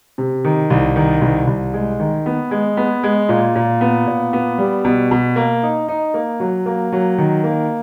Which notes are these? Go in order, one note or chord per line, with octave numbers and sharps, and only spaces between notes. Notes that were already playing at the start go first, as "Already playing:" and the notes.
C3
D#3
C2
D#3
C2
C2
G#3
D#3
B3
G#3
B3
G#3
A#2
A#2
B3
A#2
B3
G3
B2
B2
A#3
D#4
D#4
A#3
F#3
A#3
F#3
D#3
A#3